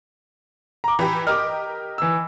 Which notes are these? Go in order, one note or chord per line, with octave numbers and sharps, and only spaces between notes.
A#5 D6
E3 G4 B5
G4 A#4 D#5 D6 F6
E3 E6